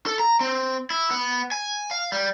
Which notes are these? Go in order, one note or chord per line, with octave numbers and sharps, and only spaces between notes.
A4
A#5
C4
E4
B3
G#5
F5
G3